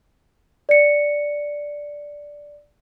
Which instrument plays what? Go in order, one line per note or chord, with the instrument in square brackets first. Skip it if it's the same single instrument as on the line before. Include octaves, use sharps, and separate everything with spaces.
[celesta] D5 C#7